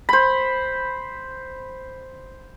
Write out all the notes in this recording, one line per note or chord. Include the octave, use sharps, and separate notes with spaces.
C5 B5